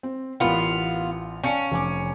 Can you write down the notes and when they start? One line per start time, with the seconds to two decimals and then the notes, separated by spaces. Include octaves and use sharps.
0.03 C4
0.40 A1 B3 F4 A#4
1.44 C#4 F5 A5 C#7
1.72 F1 G#5 D6